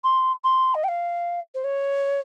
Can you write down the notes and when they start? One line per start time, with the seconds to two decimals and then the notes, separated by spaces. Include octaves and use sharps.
0.04 C6
0.44 C6
0.74 D#5
0.84 G5
0.88 F5
1.54 C5
1.64 C#5